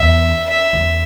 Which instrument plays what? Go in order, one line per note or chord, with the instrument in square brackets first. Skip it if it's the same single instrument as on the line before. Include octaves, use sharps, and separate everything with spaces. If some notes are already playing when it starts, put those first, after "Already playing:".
Already playing: [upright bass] E2 [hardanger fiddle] E5
[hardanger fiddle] E5
[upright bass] E2